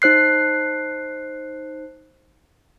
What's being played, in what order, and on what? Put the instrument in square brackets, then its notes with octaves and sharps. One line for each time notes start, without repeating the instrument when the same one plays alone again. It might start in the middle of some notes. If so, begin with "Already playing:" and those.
[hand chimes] D#4 C5 F#6 C7